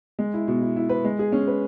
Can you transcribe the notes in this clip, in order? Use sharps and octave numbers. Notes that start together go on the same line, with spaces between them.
G#3
E4
B2
E4
E4
B4
G#3
G#4
C#4
B4